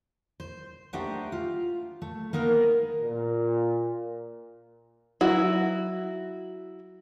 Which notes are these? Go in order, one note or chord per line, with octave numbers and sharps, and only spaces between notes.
C5
A3 D4 D#4 G4 C5 F#5
F4
A3
A#3 B3 D#4 A#4
A#2
F#3 E4 F#4